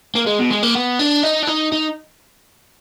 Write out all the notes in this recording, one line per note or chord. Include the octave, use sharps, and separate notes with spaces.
A#3
G#3
B2
G#3
A#3
B3
D4
D#4
D4
D#4
D#4